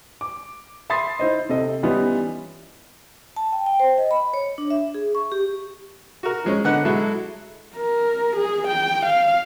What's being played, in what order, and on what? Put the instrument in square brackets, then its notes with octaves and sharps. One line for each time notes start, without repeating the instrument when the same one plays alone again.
[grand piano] D6
E5 B5 C6 D#6 A6 C7
D#4 E4 C5 D#5
C3 A4 D#5
E3 G3 B3 C#4 D#4 F4
[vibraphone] A5
G5
G5
C5
D#5
B5
C#5
D4
E5
G#4
C#6
G4
[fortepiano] F#4 A#4
F3 G#3 C#4
D3 B3 D#4 F#5 F#6
F#3 G#3 E4 F#4 A4
[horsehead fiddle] A#4
G#4
G5
F5